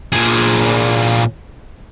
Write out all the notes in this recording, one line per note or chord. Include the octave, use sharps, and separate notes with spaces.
A#2 G#4